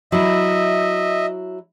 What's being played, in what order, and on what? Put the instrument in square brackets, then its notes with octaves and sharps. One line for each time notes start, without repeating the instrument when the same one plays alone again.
[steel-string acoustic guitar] F#3 E4 [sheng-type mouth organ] D#5 E5